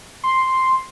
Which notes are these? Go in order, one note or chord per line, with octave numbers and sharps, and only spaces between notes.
C6